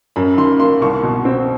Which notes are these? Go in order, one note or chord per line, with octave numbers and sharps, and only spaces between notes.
F#2 B5
D#3 C6
A#3 C6
C2 C#6
B2
C4